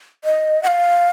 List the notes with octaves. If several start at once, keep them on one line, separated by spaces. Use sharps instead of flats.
D#5
F#5
F5